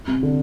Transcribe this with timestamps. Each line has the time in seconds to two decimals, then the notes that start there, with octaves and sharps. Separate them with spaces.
0.08 C3
0.23 D3